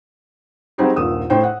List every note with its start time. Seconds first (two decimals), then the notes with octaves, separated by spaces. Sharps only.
0.78 F#3 G3 C4 D#4 G4 G#4
0.96 D#1 G2 A#2 D#6 E6
1.30 A2 C5 G5
1.44 F#5